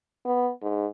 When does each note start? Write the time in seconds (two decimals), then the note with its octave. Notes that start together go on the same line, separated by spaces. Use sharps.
0.25 B3
0.61 G#2